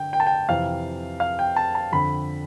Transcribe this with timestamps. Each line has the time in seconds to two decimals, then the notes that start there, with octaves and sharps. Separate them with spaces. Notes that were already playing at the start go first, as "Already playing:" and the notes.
Already playing: D3 G5
0.13 G5
0.20 A5
0.27 G5
0.49 F2 C3 E3 F5
1.20 F5
1.39 G5
1.56 A5
1.75 A5
1.92 F2 D3 B5